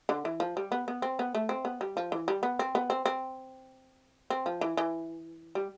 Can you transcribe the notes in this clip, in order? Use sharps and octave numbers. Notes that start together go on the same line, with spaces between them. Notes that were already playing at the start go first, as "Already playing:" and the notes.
D3
E3
F3
G3
B3
B3
C4
B3
A3
C4
B3
G3
F3
E3
G3
B3
C4
B3
C4
C4
C4
F3
E3
E3
G3